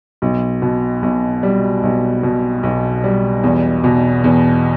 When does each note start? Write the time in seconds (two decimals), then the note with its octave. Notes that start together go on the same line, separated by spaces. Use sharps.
0.22 B1
0.62 B2
1.03 B1
1.43 G3
1.83 B1
2.23 B2
2.63 B1
3.04 G3
3.43 E2
3.84 B2
4.24 E2